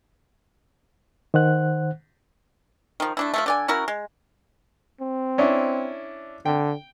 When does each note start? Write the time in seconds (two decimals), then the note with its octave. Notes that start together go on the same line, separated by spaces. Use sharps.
1.34 D#3 C5 F#5 F#6
3.00 D#3 F3
3.17 A3 D4 E4
3.34 F3 G#3 A3
3.46 D3 D5 G#5
3.68 C#4 E4 F#4 A#4
3.88 G#3
5.01 C4
5.38 C#4 D4 E4
6.46 D3 G5